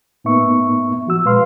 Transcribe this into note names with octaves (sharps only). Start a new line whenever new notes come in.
A2 A#3 B3 D#4 E5 C#6
F3 F#4 E6
A#2 G#3 B4 F5 C6 F6